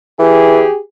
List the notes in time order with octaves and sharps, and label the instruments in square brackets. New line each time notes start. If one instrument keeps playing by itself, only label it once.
[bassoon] E3 [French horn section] G4 G#4